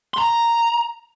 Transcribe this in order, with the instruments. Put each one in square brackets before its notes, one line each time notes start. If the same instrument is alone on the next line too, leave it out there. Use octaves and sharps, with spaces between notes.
[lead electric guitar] A#5 C6